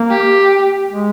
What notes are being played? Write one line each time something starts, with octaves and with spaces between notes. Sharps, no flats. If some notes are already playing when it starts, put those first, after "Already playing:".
Already playing: A#3
G4
G#3